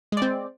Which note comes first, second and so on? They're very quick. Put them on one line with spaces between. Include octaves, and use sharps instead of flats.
G#3 D5 C4